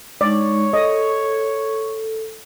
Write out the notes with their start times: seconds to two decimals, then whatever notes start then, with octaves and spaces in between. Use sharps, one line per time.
0.21 G#3 D#4 C#5 D5
0.73 A4 D#5